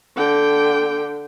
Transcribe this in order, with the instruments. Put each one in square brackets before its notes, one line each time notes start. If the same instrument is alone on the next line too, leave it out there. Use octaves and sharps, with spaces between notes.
[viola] D3 G5